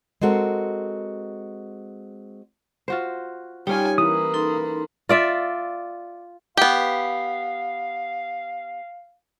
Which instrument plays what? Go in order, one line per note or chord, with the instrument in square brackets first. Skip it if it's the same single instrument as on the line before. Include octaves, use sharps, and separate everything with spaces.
[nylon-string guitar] G#3 C4 F#4 A4 A#4
[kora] F4 F#4 C5
[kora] G3 C#4 F4 [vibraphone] D#4 G4 C#5 [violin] G5 G#5
[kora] E3 [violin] A#3 B4 [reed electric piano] D#6
[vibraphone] D#4 A4 C6
[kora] F4 D5 E5
[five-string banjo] B3 G4 [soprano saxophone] F5